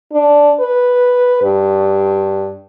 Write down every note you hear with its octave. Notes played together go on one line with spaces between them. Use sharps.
D4
B4
G2